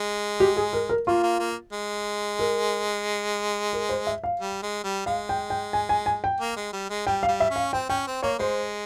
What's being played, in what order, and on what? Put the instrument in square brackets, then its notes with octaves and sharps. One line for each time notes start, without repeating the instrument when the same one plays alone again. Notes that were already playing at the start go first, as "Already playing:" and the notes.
Already playing: [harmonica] G#3
[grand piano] G4
G#4
A#4
A#4
[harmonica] A#3 [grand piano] F4
[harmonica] A#3
A#3
G#3
[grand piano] A#4
A#4
C5
E5
F5
[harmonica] G3
G#3
G3
[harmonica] G#3 [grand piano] F5
[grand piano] G5
G5
G#5
G#5
G#5
G5
[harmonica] A#3
G#3
G3
G#3
[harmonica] G3 [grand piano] G5
[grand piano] F5
[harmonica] G3
[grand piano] E5
[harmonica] C#4
[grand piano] F5
[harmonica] C4 [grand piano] G5
[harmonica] C#4 [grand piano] G5
[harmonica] C4
[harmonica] A#3 [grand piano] C#5
[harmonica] G#3 [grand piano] C5